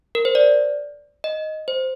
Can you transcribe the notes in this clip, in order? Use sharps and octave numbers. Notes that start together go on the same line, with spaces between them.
A#4
C5
D5
D#5
C5